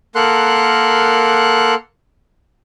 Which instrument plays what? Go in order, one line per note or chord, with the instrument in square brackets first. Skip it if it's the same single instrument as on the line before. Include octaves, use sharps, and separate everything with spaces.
[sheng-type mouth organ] A#3 A4 A#4 F#5 C6 F#6